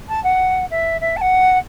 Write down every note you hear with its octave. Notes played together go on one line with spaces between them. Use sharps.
A5
F#5
E5
E5
A5
F#5